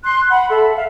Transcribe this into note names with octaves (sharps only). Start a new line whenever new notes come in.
C6 F#6
F#5 B5
A4 E5
E5 F5